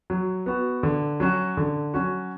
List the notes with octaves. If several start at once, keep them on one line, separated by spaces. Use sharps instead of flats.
F#3
B3 F#4
D3
F#3 C#4 F#4
D3
F#3 C#4 F#4